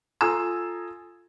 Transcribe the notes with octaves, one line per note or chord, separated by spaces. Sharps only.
F4 A4 G#5 A#5 D#6 E6